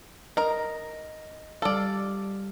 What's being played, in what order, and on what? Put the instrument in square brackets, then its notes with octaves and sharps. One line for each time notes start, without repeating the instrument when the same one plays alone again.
[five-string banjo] A#4 A#5 [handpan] D#5
[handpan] G3 F5 [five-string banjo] A4 D5